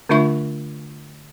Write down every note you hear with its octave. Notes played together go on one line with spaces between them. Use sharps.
D3 A3 D4 F4 E5 C#6